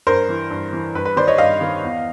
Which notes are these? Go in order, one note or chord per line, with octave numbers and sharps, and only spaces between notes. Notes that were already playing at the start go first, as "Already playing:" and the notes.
G2 A#4 C5
E3
G2
E3
G2 B4
B4
D#3 C5 D5
C#5 D#5
G2 D#5 F5
D#3
E2